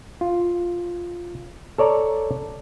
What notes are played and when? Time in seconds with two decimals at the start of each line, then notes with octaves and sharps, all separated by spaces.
0.21 F4
1.78 A4 C#5 D5 A#5